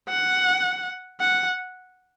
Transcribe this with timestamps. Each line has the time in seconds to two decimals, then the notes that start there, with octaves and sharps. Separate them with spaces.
0.09 F#5
1.21 F#5